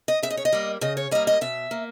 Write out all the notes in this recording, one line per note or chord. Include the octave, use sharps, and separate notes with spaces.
D#5
C#3 E5
D#5
C#5
D#5
G3 A#3
C#3 D#5
C#5
G3 A#3 D#5
D#5
B2 E5
A#3